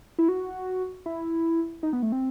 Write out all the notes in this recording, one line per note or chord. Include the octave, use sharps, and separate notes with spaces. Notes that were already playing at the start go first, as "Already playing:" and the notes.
E4
F#4
E4
D#4
B3
A3
C4